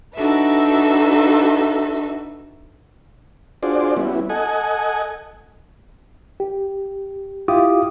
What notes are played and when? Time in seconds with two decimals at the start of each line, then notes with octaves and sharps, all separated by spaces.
0.14 D4 D#4 F#4 A4 B4 E5
3.63 D4 F4 F#4 G#4 C5 D5
3.97 G3 B3 C#4 E4 F#4
4.30 A4 D#5 F#5 G#5
6.40 G4
7.48 E4 F4 G4 F5 D6 D#6